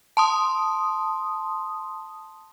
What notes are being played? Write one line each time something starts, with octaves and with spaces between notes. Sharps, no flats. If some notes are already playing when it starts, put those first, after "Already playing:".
A5 C6 D#6